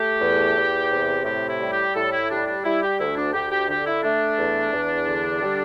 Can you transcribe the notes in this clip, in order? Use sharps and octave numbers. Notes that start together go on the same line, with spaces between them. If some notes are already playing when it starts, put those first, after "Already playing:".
Already playing: A3 G4
E2
E2
C3
A2 G4
E4
G3
G4
A2 A4
E4
G3 D4
D4
G3 E4
G4
D2 E4
D4
D2 G4
G4
D3 G4
E4
A3 D4
E2
E2
D3
G3